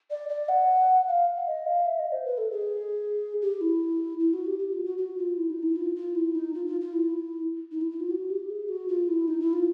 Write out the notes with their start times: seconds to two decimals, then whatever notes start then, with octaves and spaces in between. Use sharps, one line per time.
0.11 D5
0.29 D5
0.49 F#5
1.08 F5
1.47 D#5
1.66 F5
1.86 E5
1.99 D#5
2.12 C5
2.25 B4
2.38 A4
2.51 G#4
3.42 G4
3.61 E4
4.20 E4
4.33 F#4
4.46 G4
4.59 G4
4.72 F4
4.85 F#4
4.98 F#4
5.18 F4
5.37 E4
5.50 D#4
5.63 E4
5.76 F4
5.96 F4
6.15 E4
6.35 D#4
6.54 F4
6.67 F4
6.81 F4
6.93 E4
7.71 D#4
7.81 E4
7.91 E4
8.00 F4
8.11 F#4
8.30 G4
8.50 G#4
8.69 F#4
8.89 F4
9.08 E4
9.28 D#4
9.41 E4
9.53 F4